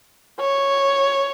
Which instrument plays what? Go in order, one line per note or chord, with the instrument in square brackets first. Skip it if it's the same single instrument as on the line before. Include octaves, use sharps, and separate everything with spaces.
[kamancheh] C#5